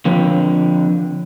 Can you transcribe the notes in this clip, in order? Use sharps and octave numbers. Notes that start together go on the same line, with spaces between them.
D3 F3 C4 B4 C#5